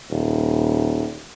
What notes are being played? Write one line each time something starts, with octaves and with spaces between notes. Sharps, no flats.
D#1